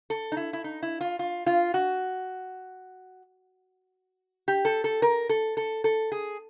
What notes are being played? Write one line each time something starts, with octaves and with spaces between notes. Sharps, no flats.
A4
D#4
E4
E4
D#4
E4
F4
F4
F4
F#4
G4
A4
A4
A#4
A4
A4
A4
G#4